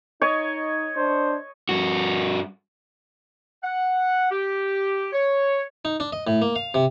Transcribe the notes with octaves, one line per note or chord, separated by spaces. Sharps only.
D#4 C#5 D#5
D4 C5
G2 F#4
F#5
G4
C#5
D#4
D4
D#5
A2
A#3
F5
C3